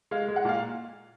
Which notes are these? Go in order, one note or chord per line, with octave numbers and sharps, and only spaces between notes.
G#3 F5
G#3
F#5
A#2 F5